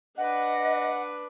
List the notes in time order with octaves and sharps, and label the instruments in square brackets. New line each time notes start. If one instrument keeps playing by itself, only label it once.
[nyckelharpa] D4 B4 [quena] D#5 [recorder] F#5